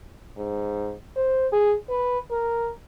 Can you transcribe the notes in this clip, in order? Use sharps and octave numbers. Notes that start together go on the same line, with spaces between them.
G#2
C5
G#4
B4
A#4